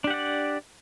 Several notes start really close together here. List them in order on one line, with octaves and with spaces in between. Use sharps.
D4 G4 F#5 D5